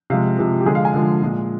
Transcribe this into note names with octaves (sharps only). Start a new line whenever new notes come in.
C3 F3 G#3 F5
C3 F3 G#3
G4
D3 F3 G#3 G#4
F5
G#5
D3 F3 G#3
A#2 G#3